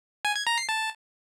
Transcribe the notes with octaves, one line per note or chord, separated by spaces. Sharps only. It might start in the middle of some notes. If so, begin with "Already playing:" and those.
G#5
G#6
A#5
C7
A5